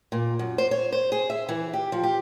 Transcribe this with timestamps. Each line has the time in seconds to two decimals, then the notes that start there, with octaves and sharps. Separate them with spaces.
0.12 A#2
0.39 F#2
0.58 C5
0.71 C#5
0.92 C5
1.12 G#4
1.30 E5
1.49 E3
1.73 G4
1.92 F3
2.03 G4